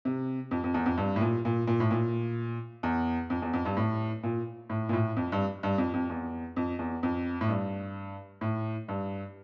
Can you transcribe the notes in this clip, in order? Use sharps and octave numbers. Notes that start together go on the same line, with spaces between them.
C3
F2
F2
E2
F2
G2
A2
A#2
A#2
A#2
A2
A#2
E2
F2
E2
F2
G2
A2
A#2
A2
A#2
A2
F2
G2
G2
F2
F2
E2
F2
E2
F2
A2
G2
A2
G2